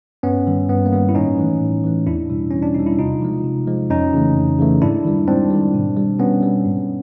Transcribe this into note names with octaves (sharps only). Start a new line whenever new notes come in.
G2 B3 C#4
D#3 G3
G2 B3
A#3
D#3 G3 B3
E4
A2 C#4 D#4
E3 A3
A2
E3 A3
E2 D4 E4
B2 G3
E2 C#4
D4
B2 G3 D#4
E4
C3 D#4 F4
F3 G#3
C3
F3 G#3
F2 C#4 D#4
C#3 E3 A3
F2
C#3 E3 A3
G#2 D4 E4
D#3 G3
G#2 C4 D4
D#3 G3
B2
G3
B2 B3 C#4
G3
G#2